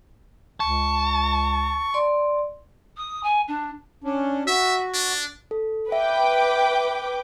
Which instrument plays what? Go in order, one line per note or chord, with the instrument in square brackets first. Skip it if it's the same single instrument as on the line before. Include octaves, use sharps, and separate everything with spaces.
[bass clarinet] C#2 [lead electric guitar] A5 [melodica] C#6
[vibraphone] D5 C6
[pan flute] D#6
G#5
D4
[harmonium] C#4 D4
[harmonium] F#4 [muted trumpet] E5
[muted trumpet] D4
[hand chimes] A4
[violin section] B4 G5 D6 [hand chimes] E5